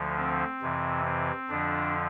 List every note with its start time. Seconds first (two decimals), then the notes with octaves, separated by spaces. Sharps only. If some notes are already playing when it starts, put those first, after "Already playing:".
Already playing: D2 D3 F3
0.17 C4
0.62 F2 C3 E3
1.05 C4
1.49 F2 D3 F3 D4